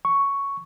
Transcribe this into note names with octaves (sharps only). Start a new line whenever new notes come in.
C#6